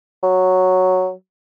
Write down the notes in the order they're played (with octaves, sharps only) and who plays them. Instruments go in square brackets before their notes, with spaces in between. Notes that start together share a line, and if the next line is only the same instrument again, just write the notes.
[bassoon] F#3